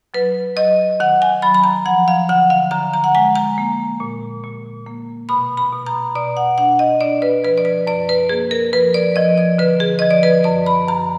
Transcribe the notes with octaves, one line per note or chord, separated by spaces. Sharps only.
F#3 B4
F#3 D#5
D#3 F#5
G#5
F#3 B5
B5
A#5
F3 F#5
F5
D3 F#5
F5
D3 A#5
A#5
F#5
G#3 G#5
A#5
A#3
A#2
A#2
A#3
B2 B5
B5
B2
A#5
B2 D5
F#5
D4 F#5
D#5
D4 D5
B4
F3 B4
D5
B4
F#2 D5
B4
A#3 G#4
A#4
F3 B4
D5
F3 D#5
D5
D3 B4
G#4
F3 D#5
D5
B4
F#2 D5
B5
F#2 A#5